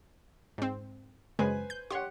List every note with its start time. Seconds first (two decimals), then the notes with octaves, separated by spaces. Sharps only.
0.58 G#2 C4
1.39 F#2 C#3 G#3 B4 C5 G#5
1.70 G6
1.91 G4 C#5 F#5 C6